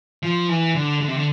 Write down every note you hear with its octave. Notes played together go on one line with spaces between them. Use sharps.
F3
E3
D3
D3
C3
D3